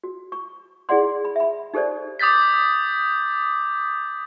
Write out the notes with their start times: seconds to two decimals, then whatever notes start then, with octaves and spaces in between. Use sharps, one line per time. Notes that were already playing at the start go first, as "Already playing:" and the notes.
0.04 F#4
0.32 C#6
0.89 E4 G#4 D5 F#5 C6
1.25 B5
1.36 E5 B5
1.74 D#4 G4 A4 C5 D5
2.19 D6 D#6 G6 A6 B6